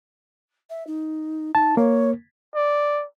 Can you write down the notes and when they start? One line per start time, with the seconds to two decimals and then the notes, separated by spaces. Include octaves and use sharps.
0.70 E5
0.87 D#4
1.55 D#4 A5
1.77 A#3 C#5
2.55 D5